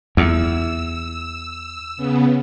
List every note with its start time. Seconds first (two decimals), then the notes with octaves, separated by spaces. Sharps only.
0.17 E2 E6
1.97 C#3 B3